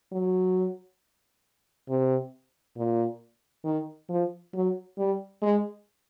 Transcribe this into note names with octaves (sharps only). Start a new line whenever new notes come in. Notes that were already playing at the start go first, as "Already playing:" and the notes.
F#3
C3
A#2
D#3
F3
F#3
G3
G#3